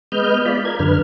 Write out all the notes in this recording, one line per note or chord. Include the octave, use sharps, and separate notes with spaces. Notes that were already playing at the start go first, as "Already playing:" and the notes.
G#3 B3 B4 D#5 F6 G6
F4 D5 B5
A#4 G#6
F#2 D3 B4 F6